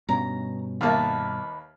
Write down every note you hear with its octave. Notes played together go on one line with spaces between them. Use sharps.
G2 B2 C#4 A#5
D#2 A#3 B4 D#5 E5 A5